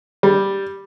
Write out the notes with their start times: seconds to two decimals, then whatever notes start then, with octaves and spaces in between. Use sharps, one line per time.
0.23 G3